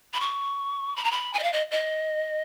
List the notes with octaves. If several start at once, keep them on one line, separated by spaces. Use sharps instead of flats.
B5
C#6
B5
A#5
B5
G#5
D#5
F5
D#5
D#5